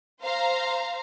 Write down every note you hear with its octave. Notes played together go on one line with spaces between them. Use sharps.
C5 F5 A#5